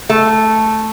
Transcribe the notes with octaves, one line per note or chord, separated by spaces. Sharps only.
A3